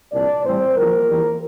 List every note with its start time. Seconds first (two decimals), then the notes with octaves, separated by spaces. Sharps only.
0.12 C2 A#2 F3 D4 D5
0.43 A2 E3 G3 C4 C5
0.76 E2 D3 F3 A#3 A#4
1.08 E2 E3 G3